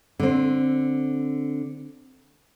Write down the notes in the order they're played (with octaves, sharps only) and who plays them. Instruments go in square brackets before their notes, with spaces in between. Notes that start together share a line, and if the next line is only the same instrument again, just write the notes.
[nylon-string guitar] D3 C4